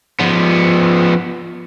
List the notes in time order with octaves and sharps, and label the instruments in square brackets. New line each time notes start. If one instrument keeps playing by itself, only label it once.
[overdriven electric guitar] F3 B3